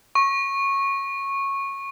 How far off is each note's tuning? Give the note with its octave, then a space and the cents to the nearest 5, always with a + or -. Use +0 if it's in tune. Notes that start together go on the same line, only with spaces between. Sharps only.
C#6 -15